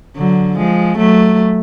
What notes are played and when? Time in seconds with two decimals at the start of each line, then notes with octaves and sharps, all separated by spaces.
0.16 D3 F#3
0.57 F3 G#3
0.97 F#3 A3